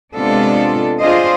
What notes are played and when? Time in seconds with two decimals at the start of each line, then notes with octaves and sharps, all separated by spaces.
0.14 C3 G#3 B3 D4 F4 A4
0.99 D4 F4 G#4 C5 D#5